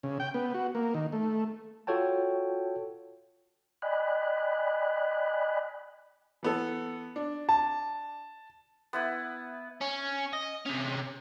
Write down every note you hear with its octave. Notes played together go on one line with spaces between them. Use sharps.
C#3
G5
B3
F#4
A#3
D#3
A3
F4 F#4 A4 C#5 G5 A5
D5 D#5 G5 G#5 B5 F#6
E3 B3 A4
D4
A5
B3 E4 B4
C#4
D#5
C3 C#4